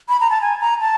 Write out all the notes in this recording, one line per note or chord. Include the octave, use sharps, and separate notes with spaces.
B5
A#5
A5
G#5
A#5
A5